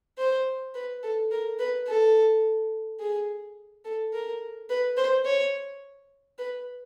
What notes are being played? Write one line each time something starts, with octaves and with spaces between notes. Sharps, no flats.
C5
B4
A4
A#4
B4
A4
G#4
A4
A#4
B4
C5
C#5
B4